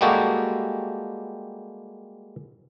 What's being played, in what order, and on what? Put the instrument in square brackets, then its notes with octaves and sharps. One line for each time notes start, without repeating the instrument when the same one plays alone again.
[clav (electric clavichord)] G3 G#3 A#3 F#4 G4 A4